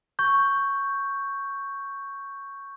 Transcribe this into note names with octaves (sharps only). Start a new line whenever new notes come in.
C#6 G6